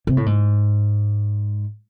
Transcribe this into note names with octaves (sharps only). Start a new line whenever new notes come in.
C3
A2
G#2